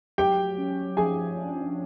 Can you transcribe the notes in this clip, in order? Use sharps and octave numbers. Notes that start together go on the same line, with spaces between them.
F#3 G4 G5
C#4
F3 G#4 G#5
D4